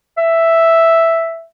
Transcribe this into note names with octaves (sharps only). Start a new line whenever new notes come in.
E5